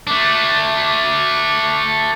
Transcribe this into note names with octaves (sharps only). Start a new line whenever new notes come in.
A3 D4